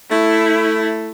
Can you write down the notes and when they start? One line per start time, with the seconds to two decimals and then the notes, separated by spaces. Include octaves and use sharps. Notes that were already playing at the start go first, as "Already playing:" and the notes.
0.10 A3 E4